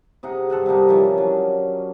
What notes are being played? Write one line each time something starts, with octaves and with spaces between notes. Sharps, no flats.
C3 D#4 G#4 F#5
G2 A4 F#5 G#5
C3 G3 A#3 D#4
E3 F3 C#4 D4
F#3